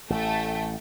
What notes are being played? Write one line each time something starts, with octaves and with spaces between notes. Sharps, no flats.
A1 A3 G5